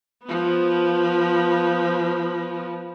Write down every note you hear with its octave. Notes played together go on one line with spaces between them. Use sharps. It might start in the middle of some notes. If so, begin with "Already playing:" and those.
F3 B3